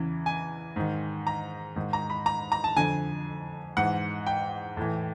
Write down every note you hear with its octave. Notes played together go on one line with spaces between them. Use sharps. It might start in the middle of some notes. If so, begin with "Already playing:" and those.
Already playing: E2 C#3 E3
G#5
G#2 D#3
A#5
G#2 D#3
A#5
B5
A#5
A#5
A5
F2 D3 G#5
G#2 E3 F#5
G5
A2 E3